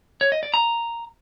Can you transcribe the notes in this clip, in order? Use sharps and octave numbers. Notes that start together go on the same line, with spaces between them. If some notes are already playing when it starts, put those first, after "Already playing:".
C#5
D#5
D5
A#5